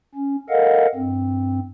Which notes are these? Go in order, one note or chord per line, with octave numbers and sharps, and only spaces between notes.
C#4
A4 A#4 D#5 F5 F#5
G2 C4